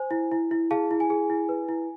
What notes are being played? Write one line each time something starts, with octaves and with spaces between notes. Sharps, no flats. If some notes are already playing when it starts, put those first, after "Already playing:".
Already playing: C5 G#5
E4
E4
E4
G#4 F5 A5
E4
G#5
G#4
E4
B4
E4